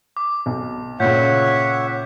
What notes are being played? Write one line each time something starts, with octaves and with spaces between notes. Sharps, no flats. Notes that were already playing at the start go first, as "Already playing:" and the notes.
D6
B1
C#2 A#2 C#5 E5 F#5 G6